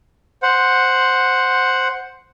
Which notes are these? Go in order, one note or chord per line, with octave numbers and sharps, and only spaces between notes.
C5 F#5